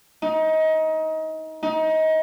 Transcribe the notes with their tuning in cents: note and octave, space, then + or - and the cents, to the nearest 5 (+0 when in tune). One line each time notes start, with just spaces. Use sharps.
D#4 +25
D#4 +25